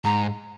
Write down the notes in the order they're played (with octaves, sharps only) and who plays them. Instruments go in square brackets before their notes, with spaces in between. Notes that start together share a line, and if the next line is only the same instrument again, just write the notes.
[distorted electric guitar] G#2 [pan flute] A#5